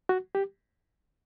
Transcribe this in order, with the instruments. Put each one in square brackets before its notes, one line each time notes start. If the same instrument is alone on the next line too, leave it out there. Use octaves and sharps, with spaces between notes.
[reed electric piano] F#4
G4